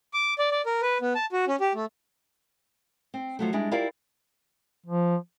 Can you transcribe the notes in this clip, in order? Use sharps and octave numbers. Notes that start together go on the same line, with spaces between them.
D6
D5
D5
A#4
B4
B3
A5
F#4
C#4
G4
A3
C4
F3 F#3 A3
G3 G#3 D4 E4
E4 F4 G4 A#4 D5 F5
F3